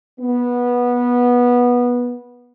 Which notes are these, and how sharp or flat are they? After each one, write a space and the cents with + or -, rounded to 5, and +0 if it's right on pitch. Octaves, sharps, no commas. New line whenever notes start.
B3 -15